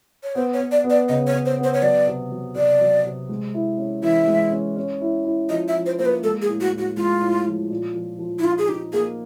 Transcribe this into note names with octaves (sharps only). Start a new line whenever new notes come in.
C#5
B3 C5
C#5
B3
D5
B3
D5
C#3 D#5
C#5
C#3
C5
B3
C5
C#5
F#3 D5
C3
F#3
C3 D5
F#3
C3
G#3
E4
C#4
E3 E5
G#3
C#4
C#4
E4
E4
F3 D#5
E5
F3
C5
A#3 C5
B4
G#3 A4
G#4
A2
F#4
A2
F#4
G#3 F4
A2
F3
A#2
F3
F3
E4
D#4 F4
G#4
D#4 G4
A#3 G#4